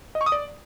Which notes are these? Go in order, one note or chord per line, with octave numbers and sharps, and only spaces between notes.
D#5
C#6
D#6
D5